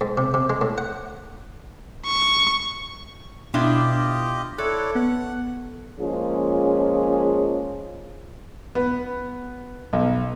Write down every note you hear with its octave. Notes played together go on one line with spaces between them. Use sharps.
G#2
C3
C3
G#3
A2
F#5
C#6
B2 B3 D4 E4 F4 G4 D#5
E4 A4 C#5 D5 F#6
B3 F#5
F3 G#3 A#3 C#4 F4 G#4
B3
B1